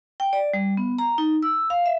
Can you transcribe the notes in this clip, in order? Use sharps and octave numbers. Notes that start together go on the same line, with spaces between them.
G5
D5
G3
B3
A#5
D#4
E6
F5
E5